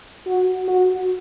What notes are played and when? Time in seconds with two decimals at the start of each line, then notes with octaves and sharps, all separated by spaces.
0.27 F#4
0.68 F#4